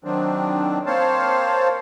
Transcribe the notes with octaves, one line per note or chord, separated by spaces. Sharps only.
D#3 F#3 C4 D4
A#3 C4 C5 C#5 F5 A5